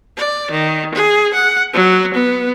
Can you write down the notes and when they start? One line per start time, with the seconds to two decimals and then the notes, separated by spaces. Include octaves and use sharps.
0.17 D5
0.51 D#3
0.94 G#4
1.34 F#5
1.73 F#3
2.14 B3